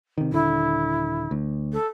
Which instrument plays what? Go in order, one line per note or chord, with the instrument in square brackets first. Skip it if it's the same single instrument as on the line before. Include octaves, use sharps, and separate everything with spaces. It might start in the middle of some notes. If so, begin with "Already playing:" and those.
[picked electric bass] C3 D#3
[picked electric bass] D#1 D3 [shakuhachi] E4
[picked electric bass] D2
[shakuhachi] A4